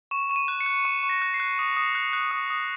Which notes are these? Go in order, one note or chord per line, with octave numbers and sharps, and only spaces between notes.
C#6 E7
C#6 E7
D#7
F#6
C#7
F#6
C#6
C#6
A#6
F#6
C7
F#6
D#6
D#6
F#6
F#6
D#6
D#6